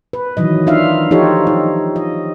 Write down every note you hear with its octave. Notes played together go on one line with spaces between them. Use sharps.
B4
D#3 E3 F#3 D#5
D4 D#4 F4 E5 F5
F3 D#4 F4 G4 A4 C#5
D#4
D#5